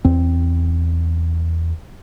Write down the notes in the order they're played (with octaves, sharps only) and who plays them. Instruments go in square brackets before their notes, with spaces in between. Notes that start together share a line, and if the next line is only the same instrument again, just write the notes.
[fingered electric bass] E2 C4